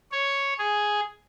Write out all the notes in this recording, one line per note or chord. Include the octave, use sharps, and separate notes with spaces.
C#5
G#4